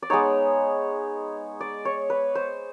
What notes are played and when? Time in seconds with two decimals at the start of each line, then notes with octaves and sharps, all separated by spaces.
0.02 D5
0.10 G#3 B3 D#4 C#5
1.61 D5
1.85 C#5
2.10 B4
2.35 C5